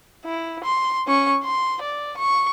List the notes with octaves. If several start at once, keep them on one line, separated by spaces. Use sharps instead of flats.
E4
C6
C#4 C#6
C6
D5
C#6